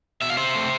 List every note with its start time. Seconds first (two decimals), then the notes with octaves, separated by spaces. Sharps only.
0.21 B2 E5
0.30 F5
0.37 C5 E5
0.55 A3 C4